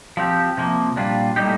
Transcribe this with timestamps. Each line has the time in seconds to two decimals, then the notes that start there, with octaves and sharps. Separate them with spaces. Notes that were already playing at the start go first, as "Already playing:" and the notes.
0.17 F3 C4 G4
0.57 C3 F3 A#3
0.96 A#2 G3 D4 F4
1.36 A2 G3 A#3 D#4 G4